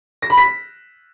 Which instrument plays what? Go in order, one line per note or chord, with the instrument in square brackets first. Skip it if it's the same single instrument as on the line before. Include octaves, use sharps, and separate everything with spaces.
[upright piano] A#6
B5
B6